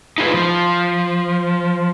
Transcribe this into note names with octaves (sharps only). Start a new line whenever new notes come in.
D#4 F4 G#4 A#4 B4
F3